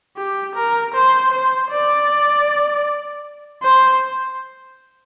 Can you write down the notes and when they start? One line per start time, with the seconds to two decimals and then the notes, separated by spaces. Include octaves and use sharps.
0.17 G4
0.56 A#4
0.94 C5
1.31 C5
1.71 D5
3.63 C5